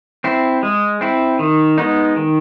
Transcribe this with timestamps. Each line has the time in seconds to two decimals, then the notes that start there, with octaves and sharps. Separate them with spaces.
0.24 C4 E4
0.63 G#3
1.01 C4 E4
1.39 D#3
1.78 G#3 B3 D#4
2.16 D#3